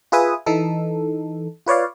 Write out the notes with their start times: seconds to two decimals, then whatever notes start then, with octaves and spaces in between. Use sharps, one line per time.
0.12 F4 G#4 B4 E5 G#5 D#6
0.46 E3 D#4 A4
1.67 F4 B4 C#5 D5 F5